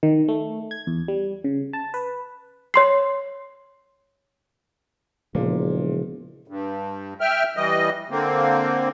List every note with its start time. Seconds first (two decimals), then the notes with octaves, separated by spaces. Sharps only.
0.03 D#3
0.28 A3
0.71 G#6
0.87 E2
1.08 G3
1.44 C#3
1.73 A5
1.94 B4
2.74 C#5 C6 C7
5.35 E1 A#2 C#3 F3
6.48 G2
7.21 E5 G5 F6
7.57 E3 G3 D#5
8.10 D3 A#3 C4